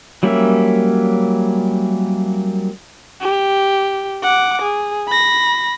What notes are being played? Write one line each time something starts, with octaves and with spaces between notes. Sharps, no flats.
F#3 G3 A#3 C#4 E5
G4
F#5 D6
G#4
B5 A#6